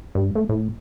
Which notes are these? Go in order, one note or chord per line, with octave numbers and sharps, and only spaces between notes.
G2
A3
A2